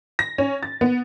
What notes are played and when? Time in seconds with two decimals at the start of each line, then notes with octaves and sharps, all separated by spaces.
0.19 A#6
0.38 C#4
0.63 A6
0.81 B3